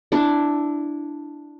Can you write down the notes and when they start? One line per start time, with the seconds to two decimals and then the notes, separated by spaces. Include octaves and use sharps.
0.12 D4 E4